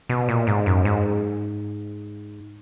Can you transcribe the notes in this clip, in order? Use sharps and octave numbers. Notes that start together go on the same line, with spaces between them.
B2
A#2
G#2
F#2
G#2